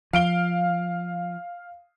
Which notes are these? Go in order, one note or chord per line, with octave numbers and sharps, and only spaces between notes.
F3 F5 D7 G7